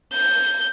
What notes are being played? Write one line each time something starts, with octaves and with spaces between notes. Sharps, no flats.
G6